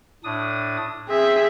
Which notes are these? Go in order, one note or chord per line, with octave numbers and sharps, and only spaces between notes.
A2 D4 D#6
C4 G#4 E5